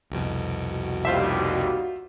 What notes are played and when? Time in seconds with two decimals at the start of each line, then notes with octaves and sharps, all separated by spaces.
0.10 C2 F2 B2
0.72 F#4
1.05 D#2 G3 F4 C5 E5